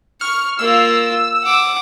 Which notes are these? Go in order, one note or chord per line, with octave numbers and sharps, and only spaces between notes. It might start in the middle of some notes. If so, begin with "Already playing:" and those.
C#6 F6
A#3 F4 E6
F#5 D6